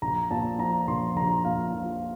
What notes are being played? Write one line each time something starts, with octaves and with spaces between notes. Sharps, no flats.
A#1 A#5
A#2 A5
F3 A#5
A#1 C6
A#1 A#5
A#2 F5
F3